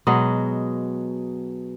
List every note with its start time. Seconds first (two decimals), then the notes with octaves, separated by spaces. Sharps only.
0.07 B2 F#3 G#3 D#5